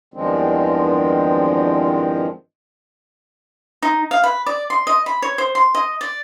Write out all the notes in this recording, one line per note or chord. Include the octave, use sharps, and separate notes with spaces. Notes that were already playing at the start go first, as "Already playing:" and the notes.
E2 G2 D#3 F3 G#3 C4
D#4
F5
B4
D5
C6
D#5
B5
C#5
C5
C6
D#5
D5